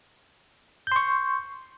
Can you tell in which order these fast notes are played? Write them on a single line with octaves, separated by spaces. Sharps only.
G6 C6 C#6